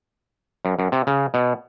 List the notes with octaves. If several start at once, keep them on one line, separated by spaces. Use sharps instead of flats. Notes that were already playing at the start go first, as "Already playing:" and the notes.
F#2
F#2
C3
C#3
B2